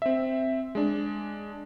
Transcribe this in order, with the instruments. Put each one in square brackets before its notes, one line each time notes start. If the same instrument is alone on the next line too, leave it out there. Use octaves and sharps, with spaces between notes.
[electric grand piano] C4 E5
G#3 D4